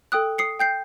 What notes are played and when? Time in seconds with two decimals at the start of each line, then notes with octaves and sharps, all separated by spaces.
0.12 A4 G5 D#6 F#6
0.38 D#6 C7 C#7
0.59 G5 G6 C7